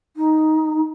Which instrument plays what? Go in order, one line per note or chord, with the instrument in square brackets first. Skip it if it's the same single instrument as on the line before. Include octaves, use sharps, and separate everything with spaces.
[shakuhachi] D#4